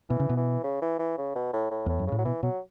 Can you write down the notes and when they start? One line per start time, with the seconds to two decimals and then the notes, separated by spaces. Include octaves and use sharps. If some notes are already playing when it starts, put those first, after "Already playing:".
0.10 B2 E3
0.20 C#3
0.29 B2
0.37 E3
0.63 C#3
0.82 E3
0.99 E3
1.18 C#3
1.36 B2
1.53 A2
1.71 A2
1.86 E2 A2
1.99 F#2
2.07 A2 C#3
2.18 F#3
2.25 B2 E3
2.43 B2 F#3